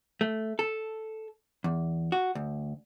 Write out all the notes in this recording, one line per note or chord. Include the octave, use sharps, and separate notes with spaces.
A3
A4
E2
F#4
D2